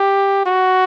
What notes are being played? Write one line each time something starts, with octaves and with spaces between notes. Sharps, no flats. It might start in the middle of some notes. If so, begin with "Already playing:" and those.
Already playing: G4
F#4